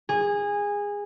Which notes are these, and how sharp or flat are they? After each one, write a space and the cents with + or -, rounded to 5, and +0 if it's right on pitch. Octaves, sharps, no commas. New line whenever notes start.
G#4 -20